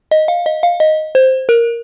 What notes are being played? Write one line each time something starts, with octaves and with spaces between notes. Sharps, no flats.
D#5
F5
D#5
F5
D#5
C5
A#4